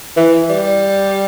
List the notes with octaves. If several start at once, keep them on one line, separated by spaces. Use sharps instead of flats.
E3
G3